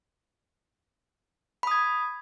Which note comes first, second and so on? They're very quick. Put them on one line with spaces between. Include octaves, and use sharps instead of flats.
B5 D#6 G#6